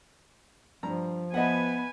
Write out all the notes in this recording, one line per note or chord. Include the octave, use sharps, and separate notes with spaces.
G2 F3 A#5
B3 B4 D#5 E5 F#5 G#5